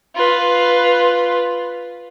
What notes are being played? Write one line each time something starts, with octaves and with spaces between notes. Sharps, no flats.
F4 B4